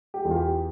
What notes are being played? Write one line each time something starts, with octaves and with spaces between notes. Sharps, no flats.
G4
E2
F4
G4